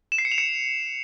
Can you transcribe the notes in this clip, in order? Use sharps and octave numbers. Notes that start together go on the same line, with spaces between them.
E7
C7
C#7
F7
C#7